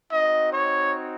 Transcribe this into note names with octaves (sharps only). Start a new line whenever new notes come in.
C4 D#4 F#4 D#5
C#5